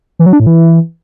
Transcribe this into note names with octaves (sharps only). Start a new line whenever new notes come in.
E3
F#3
D4
A2
E3